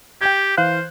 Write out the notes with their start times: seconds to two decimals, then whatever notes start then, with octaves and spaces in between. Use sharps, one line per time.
0.21 G4 G5 G6 G#6
0.57 E3 C5 F5 F#6